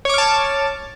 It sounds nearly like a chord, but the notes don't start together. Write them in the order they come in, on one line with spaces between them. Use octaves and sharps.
C#5 D6 F6 A5